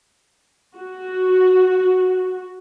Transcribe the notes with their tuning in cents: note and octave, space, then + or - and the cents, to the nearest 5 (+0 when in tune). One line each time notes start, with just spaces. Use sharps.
F#4 +0